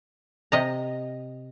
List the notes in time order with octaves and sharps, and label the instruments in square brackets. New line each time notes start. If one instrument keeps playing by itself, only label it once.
[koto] C3 D#5 A#5